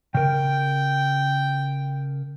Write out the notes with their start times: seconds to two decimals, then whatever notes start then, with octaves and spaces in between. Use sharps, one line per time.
0.15 C#3 A#4 G5